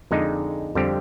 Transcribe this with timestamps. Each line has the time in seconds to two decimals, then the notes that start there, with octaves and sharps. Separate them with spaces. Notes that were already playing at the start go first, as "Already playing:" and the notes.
0.11 F2 D3 G#3 D#4
0.75 F2 D3 G3 C4 G4